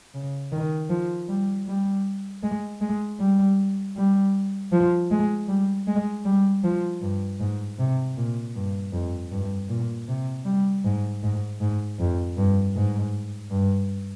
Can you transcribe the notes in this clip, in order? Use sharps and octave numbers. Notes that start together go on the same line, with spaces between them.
C#3
D#3
F3
G3
G3
G#3
G#3
G3
G3
F3
G#3
G3
G#3
G3
F3
G2
G#2
C3
A#2
G2
F2
G2
A#2
C3
G3
G#2
G#2
G#2
F2
G2
G#2
G2